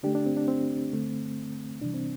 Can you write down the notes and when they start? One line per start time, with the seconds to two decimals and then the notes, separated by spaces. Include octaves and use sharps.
0.03 D3 A3 D4 G4
0.15 D4
0.26 C4
0.37 D4
0.48 C4
0.93 D3 A3
1.81 C3 E3 G3 D4
1.94 C4